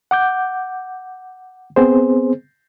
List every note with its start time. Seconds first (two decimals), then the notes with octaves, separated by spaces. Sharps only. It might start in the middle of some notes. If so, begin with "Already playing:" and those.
0.11 F#5 D6 G6
1.76 B3 C4 G#4 C5